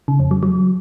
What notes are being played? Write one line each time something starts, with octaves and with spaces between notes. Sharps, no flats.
C#3
F2
F#3
F#3